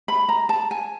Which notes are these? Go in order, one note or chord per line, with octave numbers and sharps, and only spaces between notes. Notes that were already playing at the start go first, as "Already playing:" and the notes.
B5
A#5
A5
G#5